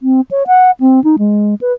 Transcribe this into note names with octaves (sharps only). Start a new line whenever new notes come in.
C4
C#5
F#5
C4
D#4
G#3
B4